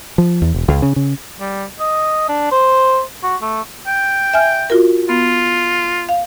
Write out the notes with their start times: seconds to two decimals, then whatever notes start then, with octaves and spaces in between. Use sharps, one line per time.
0.18 F3
0.42 E2
0.54 E1
0.68 C#2
0.82 C#3
0.96 C#3
1.40 G3
1.80 D#5
2.29 D4
2.52 C5
3.23 F#4
3.42 A3
3.87 G5
4.33 E5 G#5 F6
4.70 F4 F#4 A#4
5.09 B3 F4
6.09 F5